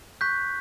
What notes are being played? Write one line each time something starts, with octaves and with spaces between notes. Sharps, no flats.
C#6 F#6 G6 B6